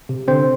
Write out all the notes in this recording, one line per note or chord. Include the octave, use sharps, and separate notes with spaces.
C3
D3 C4 C5